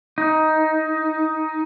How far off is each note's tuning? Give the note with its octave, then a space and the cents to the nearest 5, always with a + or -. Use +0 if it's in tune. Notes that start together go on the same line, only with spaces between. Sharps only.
D#4 +10